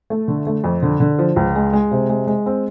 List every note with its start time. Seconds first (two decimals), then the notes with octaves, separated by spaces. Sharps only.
0.10 A3
0.28 D3
0.47 A3
0.64 F2
0.82 D3
1.00 D3
1.19 F3
1.36 C#2
1.55 G#3
1.73 G#3
1.91 C3
2.09 G#3
2.27 G#3
2.46 C4